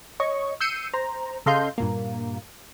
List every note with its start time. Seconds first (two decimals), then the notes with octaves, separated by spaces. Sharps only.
0.20 C#5 D#5 C#6
0.61 E6 G6 C7 C#7 D#7
0.94 C5 A#5
1.46 C#3 A4 D#5 F5 C6 G6
1.78 G2 A#2 A#3